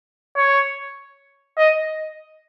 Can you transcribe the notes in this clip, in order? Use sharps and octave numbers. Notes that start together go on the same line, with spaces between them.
C#5
D#5